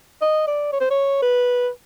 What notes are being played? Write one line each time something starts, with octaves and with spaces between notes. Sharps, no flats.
D#5
D5
C#5
C5
C#5
B4